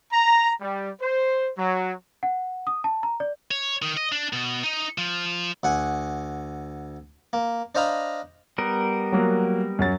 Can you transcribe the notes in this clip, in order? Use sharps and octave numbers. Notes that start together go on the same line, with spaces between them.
A#5
G3
C5
F#3
F#5
D#6
A5
A#5
D5
C#5
D#3
D#5
D4
B2
D#4
F3
D2 F#5 G#5
A#3
D4 C5 D#5 F5 A#5 B5
G3 B3 A#4
F#3 A#3
F#2 F#3 A6